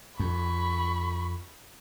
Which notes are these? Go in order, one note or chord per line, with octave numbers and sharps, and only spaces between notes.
F2 B5 C#6